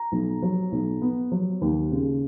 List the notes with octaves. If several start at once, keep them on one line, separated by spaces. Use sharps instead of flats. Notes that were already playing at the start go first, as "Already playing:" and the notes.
Already playing: A#5
B1
F#3
B1
B3
F#3
D#2
C#3